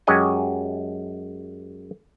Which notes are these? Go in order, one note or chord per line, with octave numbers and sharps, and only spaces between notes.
F#2 G#3 G4 C#5 D#5 G#5